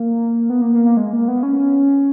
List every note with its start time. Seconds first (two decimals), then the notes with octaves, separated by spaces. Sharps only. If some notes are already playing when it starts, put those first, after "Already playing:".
Already playing: A#3
0.50 B3
0.61 A#3
0.74 A#3
0.85 A#3
0.97 G#3
1.13 A#3
1.28 B3
1.43 C#4